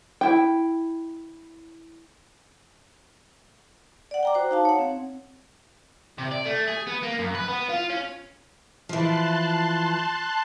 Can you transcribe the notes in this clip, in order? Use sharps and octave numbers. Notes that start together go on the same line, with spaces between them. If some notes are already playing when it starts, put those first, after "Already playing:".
E4 G5
D5 F#5
G5 A#5 D6
F#4 C5 A#5
D#4 F5 A5
C#5 F#5
C4
C3
D5
A3
G#4
B3
A#3
F#2
B4
B3
F4
C#4
E3 F3 A5 C6 F#6